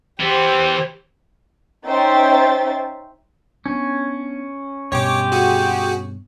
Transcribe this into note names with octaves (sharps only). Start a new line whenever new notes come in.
E3 B3 G4 C5
C#4 D#4 C5 E5 G5 A6
B3 C#4 D4
G2 B2 G#3 G4 C#5 D6
F#4 G#4